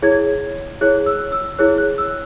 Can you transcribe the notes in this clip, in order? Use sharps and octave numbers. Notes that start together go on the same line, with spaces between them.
E4 G#4 C#5 G#6
E4 G#4 C#5 F#6
E6
E6
E4 G#4 C#5 F#6
F#6
E6